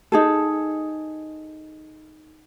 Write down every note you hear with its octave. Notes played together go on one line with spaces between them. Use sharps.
D#4 G#4 A4